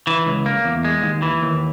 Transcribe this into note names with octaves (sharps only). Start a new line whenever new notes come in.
E3
C#2
A#3
E2
G#3
D#2
E3
D#2